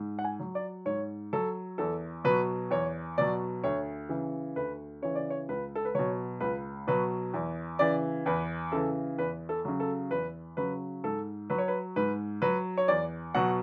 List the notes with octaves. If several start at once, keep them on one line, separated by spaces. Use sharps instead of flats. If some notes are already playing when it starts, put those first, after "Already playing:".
Already playing: G#2
F#5
G#5
F#3
D5
G#2 C#5
F#3 A4
E2 A4
B2 F#3 B4
E2 C#5
B2 F#3 D5
D2 C#5
C#3 E3
D2 B4
C#3 E3 C#5
D5
C#5
C#2 B4
A4
B4
B2 F#3 C#5
C#2 B4
B2 F#3 B4
E2
C#3 E3 D5
E2 B4
C#3 E3 A4
E2 B4
A4
C#3 F#3
A4
E2 B4
C#3 F#3 B4
G#2 A4
F#3 B4
C#5
B4
G#2 B4
F#3 B4
C#5
E2 D5
B2 F#3 F#5